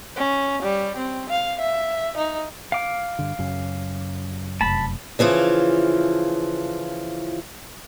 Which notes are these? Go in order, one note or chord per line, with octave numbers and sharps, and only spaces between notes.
C#4
G3
C4
F5
E5
D#4
F5 D6
G2 D3
F#2 C#3 C#4
F1 A5 B5
C#3 E3 F3 F4